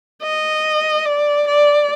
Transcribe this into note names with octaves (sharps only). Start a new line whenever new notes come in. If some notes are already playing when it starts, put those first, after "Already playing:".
D#5
D5
D5